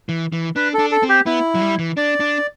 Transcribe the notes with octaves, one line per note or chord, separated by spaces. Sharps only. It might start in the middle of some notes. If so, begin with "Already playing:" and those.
E3
E3
D4 B4
A4
D4
A4
C4
G4
B3 E4
F#3
G3
E3
D4 D5
D4